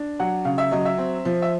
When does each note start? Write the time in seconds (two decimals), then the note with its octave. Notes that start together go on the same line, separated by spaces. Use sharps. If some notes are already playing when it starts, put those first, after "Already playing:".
Already playing: D4
0.19 F#3 F#5
0.45 C#3 F5
0.58 E5
0.71 F#3 D#5
0.85 E5
0.98 C4
1.25 F3
1.42 E5